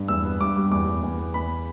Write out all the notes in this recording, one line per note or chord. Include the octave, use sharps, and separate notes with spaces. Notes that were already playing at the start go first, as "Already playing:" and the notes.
Already playing: G2
E2 E6
B3
G2 D6
G3
E2 D6
E2
E2
B3
E2 B5